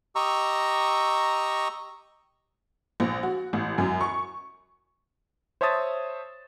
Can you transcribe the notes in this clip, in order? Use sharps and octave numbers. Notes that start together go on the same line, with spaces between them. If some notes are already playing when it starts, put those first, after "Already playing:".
G4 D#5 A#5 C#6 E6
A#1
F#4
A1
F#2
C#6
C5 C#5 E5 A5 D#6 A6